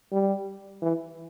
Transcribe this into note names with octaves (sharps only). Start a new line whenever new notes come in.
G3
E3